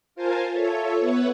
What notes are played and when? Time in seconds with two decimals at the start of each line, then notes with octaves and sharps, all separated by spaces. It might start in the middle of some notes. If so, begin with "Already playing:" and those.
0.15 F4 A#4 C5 F5 G#5 A5
0.52 F4 A4 C#5 E5
1.00 B3 B4 C#5 E5 F#5